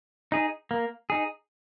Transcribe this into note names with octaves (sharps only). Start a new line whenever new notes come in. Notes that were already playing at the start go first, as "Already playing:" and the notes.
D#4 G#4
A#3
D#4 G#4